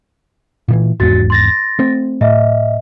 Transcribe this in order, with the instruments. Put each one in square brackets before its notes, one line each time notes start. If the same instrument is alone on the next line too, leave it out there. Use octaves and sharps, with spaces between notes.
[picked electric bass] A#2 D#3 E3
[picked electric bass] G#1 E2 G#2 [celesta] F#4 A6
[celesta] C6 A6 A#6
[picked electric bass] A3 C4
[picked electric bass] A2 [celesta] D#5 E5